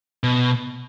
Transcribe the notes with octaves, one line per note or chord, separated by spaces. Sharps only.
B2